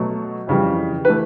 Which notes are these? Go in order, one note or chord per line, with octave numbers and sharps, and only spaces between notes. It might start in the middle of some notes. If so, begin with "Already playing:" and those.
Already playing: B2 F#3 A3
F2 C#3 E3 G3
B4
E3 A3